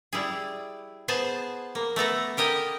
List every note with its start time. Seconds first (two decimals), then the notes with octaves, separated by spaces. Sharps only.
0.13 G3 E4 G#4
1.08 B3 G#4 C5 G#5 A5
1.75 A#3
1.96 A3 B3 A4 A#5
2.37 G4 A#4 D#5 G5 G#5